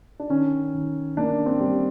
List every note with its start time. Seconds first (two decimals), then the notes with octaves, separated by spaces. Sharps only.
0.20 D4
0.30 D#3 C#4
0.74 D#3
1.17 A#3 D4
1.46 C4
1.61 G3